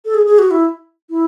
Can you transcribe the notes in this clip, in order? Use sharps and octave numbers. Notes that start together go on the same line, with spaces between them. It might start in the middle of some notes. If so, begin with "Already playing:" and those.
A4
G#4
G#4
F#4
E4
E4